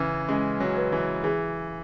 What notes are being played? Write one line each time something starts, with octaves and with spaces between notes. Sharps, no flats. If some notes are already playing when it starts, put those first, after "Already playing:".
Already playing: C#3 E3 C#4
G#3 C#4
F#3
B4
E3
E3 G#4